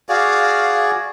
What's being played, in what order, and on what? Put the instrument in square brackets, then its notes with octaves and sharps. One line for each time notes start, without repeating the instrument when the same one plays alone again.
[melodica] F#4 G#4 D5 [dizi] F5